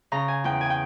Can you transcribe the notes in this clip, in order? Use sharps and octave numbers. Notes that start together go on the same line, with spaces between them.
C#3 A#5
G#5
E2 G5
G#5
G5